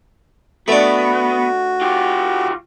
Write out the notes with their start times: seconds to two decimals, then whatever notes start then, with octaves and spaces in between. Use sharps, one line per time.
0.68 A3 B3 D4 F#4
1.82 F4 G4